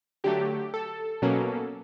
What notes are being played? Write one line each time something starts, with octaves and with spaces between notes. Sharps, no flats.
D3 F#3 A3 G4
A4
B2 F#3 A#3 C#4